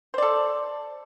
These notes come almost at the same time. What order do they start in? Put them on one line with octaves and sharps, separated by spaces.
C5 D5 A4